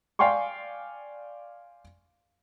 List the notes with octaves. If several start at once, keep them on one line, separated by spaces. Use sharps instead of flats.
D5 F5 G5 G#5 C6 C#6